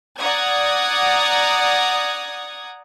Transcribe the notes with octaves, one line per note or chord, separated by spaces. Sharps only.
D5 F#5 A#5 D#6 G#6